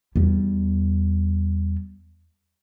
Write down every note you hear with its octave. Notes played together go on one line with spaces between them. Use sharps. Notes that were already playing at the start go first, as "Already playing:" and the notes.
E2 G3